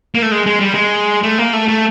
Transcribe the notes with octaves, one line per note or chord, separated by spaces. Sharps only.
A#3
A3
G#3
G#3
G3
G#3
A3
A#3
A3
A3